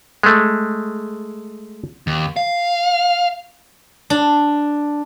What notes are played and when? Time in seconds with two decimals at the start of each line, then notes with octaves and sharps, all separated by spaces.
0.23 G#3 A3
2.07 D#2
2.37 F5
4.10 D4